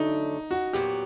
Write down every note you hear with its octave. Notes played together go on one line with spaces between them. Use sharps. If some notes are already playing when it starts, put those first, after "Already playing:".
Already playing: D3 F#3 A3 D4 D#4
F#4
A#2 F#3 B3 G4